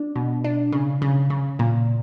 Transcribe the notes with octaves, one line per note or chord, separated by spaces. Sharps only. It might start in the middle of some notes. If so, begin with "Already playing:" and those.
Already playing: D4
B2
D4
C#3
C#3
C#3
A#2